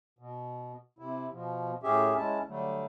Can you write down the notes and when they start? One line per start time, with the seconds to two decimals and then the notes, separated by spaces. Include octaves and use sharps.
0.19 B2
0.99 C3 E4
1.32 B2 F3
1.83 A2 C#4 G4 G#4 E5
2.17 G#3 C#4 E4 A5
2.48 D3 F#3 G3 A3